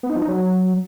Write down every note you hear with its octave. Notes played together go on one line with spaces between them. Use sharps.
B3
D#4
F3
D#4
F#3